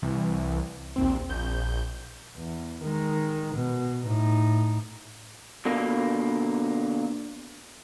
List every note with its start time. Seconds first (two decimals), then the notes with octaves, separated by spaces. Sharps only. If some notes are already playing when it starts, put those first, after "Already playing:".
0.02 C2 E3
0.96 A#1 D#2 C4
1.29 A#1 G6
2.37 E2
2.82 D#3 G#3
3.56 B2
4.05 A2 D#4
5.65 B2 D3 A#3